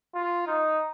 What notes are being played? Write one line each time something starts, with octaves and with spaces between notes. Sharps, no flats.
F4
D#4